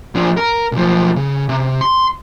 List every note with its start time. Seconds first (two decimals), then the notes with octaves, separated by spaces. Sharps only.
0.15 F3 D4
0.37 A#4
0.72 B1 F3
1.16 C#3
1.49 C3
1.81 C6